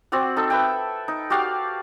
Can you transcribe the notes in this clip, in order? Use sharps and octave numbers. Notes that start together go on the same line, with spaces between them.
C4 F#4 D5 F#5
D#4 A4
B4 E5 G5
D#4
F#4 G4 D5 F5